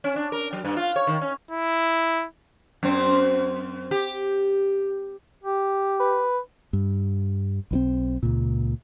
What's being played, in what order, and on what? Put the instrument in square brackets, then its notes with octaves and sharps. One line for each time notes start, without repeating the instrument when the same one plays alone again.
[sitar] C#4
D4
A#4
F#3
G2
F4
C#5
D#3
C#4
[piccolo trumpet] E4
[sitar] F#2 C4
G4
[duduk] G4
[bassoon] B4
[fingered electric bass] G2
B1 D#3 C4
C#2 A#2